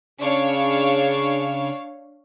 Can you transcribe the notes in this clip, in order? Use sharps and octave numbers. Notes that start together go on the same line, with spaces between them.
C#3 D4 C#5 F5